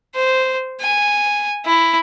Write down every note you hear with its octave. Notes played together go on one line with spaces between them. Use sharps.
C5
G#5
E4